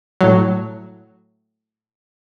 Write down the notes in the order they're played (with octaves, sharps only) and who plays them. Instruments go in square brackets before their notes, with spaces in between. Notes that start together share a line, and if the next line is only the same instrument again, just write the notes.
[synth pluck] A2 F#3